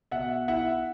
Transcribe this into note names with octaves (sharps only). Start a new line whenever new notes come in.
B2 E5 F#5
E4 E5 F#5